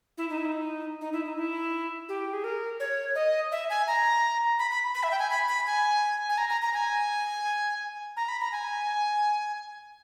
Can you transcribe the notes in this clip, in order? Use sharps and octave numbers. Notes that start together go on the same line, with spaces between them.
E4
D#4
E4
D#4
D#4
E4
D#4
E4
G4
G#4
A#4
C#5
D#5
E5
G#5
A#5
B5
B5
B5
E5
G5
G#5
B5
B5
G#5
G#5
A#5
A#5
A#5
G#5
A#5
B5
A#5
G#5